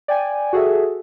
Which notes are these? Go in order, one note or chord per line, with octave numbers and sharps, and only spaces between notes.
D5 G5 G#5
F#4 G#4 A4 E5